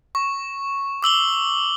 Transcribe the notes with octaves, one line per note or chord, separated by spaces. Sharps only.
C#6
D6 E6 F#7 G7